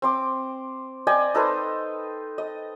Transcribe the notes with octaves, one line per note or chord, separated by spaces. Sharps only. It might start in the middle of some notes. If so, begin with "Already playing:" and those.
C4 C6 D6
D5 D#5 G5 G#5
D#4 A4 B4 C5
D#5